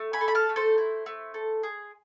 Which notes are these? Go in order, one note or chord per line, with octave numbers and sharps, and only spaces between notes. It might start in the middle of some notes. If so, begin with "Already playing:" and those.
Already playing: A3
G#5 B5
A4
B5
F5 A5
A3
A4 C5
E4
A3
A4
G#4